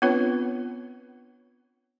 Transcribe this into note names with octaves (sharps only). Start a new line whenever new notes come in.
B3 C4 D4 F4 B4 C#5